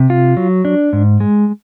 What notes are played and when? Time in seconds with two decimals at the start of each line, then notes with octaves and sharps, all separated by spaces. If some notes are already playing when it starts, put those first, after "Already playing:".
Already playing: C3
0.10 F4
0.37 F#3
0.65 D4
0.93 G#2
1.20 G#3